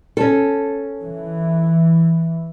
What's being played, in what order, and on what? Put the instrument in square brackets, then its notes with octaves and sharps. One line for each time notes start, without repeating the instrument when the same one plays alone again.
[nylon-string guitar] C#4 A4
[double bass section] E3